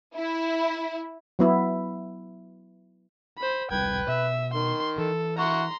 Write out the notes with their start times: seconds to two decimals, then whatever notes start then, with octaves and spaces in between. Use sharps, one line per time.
0.15 E4
1.39 F#3 B3 E4
3.38 C5 B5
3.71 E1 C2 G3 B4 G5 G#6
4.08 B2 E5
4.54 D#3 C6
4.98 E3 A4
5.39 E4 F#5 A#5 C6 C#6